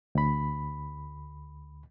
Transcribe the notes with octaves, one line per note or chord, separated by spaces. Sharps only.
D2 B5